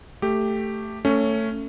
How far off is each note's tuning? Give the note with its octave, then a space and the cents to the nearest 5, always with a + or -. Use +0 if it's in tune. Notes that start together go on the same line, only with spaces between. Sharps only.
A3 +5 G4 +0
A3 +20 C#4 +0